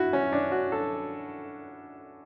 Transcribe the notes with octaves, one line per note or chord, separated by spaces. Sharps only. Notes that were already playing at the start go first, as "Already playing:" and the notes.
Already playing: E4 F#4
C#4
D4
F#4
A4